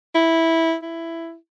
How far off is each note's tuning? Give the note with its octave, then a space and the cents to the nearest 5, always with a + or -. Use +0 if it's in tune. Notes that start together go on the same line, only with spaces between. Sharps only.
E4 -10
E4 +10